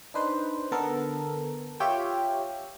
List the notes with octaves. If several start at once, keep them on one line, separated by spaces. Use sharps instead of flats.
D4 D#4 B4 C5
D3 B3 A4 A#4
F4 G4 C#5 E5 G5